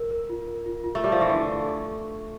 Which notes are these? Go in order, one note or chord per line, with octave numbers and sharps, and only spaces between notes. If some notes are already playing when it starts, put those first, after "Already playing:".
Already playing: A#4
A#4
F4
A#4
F4
F4
A3
G3 E5
F3
E3 C#6
D3
A4